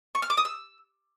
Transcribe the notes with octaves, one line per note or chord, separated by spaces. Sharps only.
C#6
F6
D6
D#6
E6